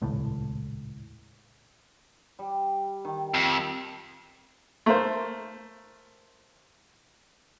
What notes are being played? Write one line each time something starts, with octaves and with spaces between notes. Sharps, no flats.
D#1 C#2 A2
G3
D#3
F2
A3 A#4 C5